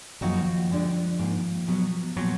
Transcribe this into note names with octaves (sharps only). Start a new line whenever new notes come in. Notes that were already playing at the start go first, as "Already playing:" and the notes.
F#2 D#3 F3 A#3 D#4 F#4
D2 D3 G#3 D4
G#2 D#3 A#3
B2 F#3 B3
A#2 F3 F#3 B3